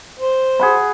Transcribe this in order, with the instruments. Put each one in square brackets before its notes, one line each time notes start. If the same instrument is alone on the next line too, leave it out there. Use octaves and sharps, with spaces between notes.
[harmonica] C5
[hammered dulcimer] G#4 F#5 B5